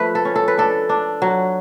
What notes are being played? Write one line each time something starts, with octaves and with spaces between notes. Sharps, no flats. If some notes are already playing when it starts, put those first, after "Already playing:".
Already playing: F3 A3 B4
A4
C#4
A4
B4
D4 A4
D4
F#3